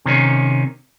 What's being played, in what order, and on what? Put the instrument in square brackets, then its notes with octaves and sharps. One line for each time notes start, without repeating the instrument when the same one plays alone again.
[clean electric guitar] C3 D#3 C#4